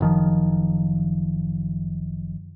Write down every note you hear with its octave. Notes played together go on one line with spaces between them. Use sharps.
F#1 D#3 F3